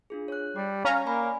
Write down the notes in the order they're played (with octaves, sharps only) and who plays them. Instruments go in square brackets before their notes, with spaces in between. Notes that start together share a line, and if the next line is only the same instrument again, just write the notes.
[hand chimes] D4 F4 G#4
C#5 F#6
[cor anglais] G3 [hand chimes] G4
[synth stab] C#4 A#5 [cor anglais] F5
[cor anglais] A#3 [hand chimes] D5 G#5 B5